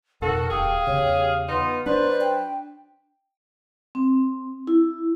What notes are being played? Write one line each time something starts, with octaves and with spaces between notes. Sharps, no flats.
F2 B2 D#3 F#4 A4 A#4
D#1 G4 G#4 F5 G5
E2 C#3 C#5
B3 D#4 F4 C6
F#3 D4 B4 C5 D5
G5
C4
E4